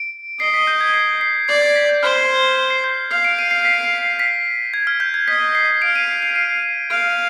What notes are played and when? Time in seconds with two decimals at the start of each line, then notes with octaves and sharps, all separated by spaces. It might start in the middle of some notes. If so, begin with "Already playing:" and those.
Already playing: D7
0.40 D#5 C7
0.54 B6
0.67 G6
0.81 G#6
0.94 C7
1.21 C7
1.48 D5 C7
1.62 G#6
1.76 B6
1.89 G6
2.03 C5 F6
2.70 C7
2.84 G6
3.11 F5 C7
3.24 D7
3.38 D#7
3.51 C7
3.65 B6
4.19 B6
4.74 G#6
4.87 F6
5.00 G6
5.14 G#6
5.28 D#5 B6
5.55 C7
5.82 F5 D7
5.96 D#7
6.23 D#7
6.36 D#7
6.90 F5 D7